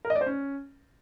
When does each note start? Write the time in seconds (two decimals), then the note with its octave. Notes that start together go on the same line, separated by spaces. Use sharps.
0.05 A#4
0.10 D#5
0.15 D5
0.21 C5
0.26 C#4